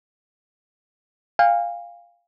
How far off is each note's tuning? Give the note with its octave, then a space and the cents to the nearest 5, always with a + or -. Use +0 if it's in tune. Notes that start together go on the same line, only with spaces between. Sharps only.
F5 +0 G#5 -45